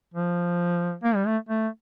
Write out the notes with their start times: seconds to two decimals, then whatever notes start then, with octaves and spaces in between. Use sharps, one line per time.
0.14 F3
1.04 A#3
1.15 G3
1.27 A3
1.49 A3